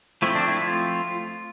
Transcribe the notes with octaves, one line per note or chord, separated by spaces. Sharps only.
F3 A3 C4 E4
D4
E4
F4